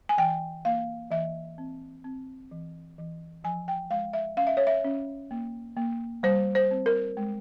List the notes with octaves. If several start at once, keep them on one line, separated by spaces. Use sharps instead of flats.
G#5
E3 G5
A#3 F5
E3 E5
C4
C4
E3
E3
F3 G#5
G5
G#3 F5
E5
C#4 F5
E5
C#5
E5
C#4
A#3
A#3
G3 C5
C5
C4
A#4
G#3